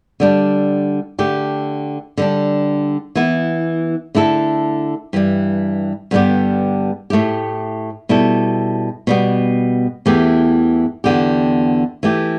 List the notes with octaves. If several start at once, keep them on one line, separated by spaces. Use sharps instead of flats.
D3 G3 D4
D3 A3 G4
D3 G3 D4
E3 B3 E4
D3 A3 E4 A4
G2 E3 G3
G2 D3 G3 B3 G4
A2 A3 E4 G4
B2 G3 E4 A4
B2 G3 B3
E2 E3 A3 G4
E2 D3 B3 G4
E3 A3 G4